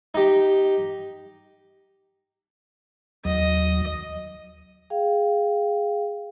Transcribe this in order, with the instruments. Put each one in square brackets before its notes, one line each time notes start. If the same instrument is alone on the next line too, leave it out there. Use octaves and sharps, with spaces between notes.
[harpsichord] D#4 G4
[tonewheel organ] D#2 F#3 [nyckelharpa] D#5
[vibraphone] G#4 F5 G5